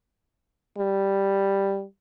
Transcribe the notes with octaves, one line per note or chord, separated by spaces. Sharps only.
G3